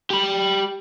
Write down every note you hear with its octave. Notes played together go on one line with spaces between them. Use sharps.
G4 B5